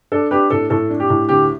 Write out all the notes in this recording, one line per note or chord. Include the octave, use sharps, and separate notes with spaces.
D4 A4
D4 G4 B4
A2 A4
A2 A4
D4
G4
A2
D2 G4